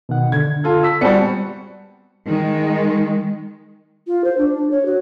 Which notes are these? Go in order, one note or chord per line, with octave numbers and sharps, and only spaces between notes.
B2 D#3 F#5
D3 G#6
F4 A4
E6 B6
G3 B3 C4 F#4 D5 G#5 A5 C#7
D#3 G#3
F4
C5
D4
D4
C#5
F#4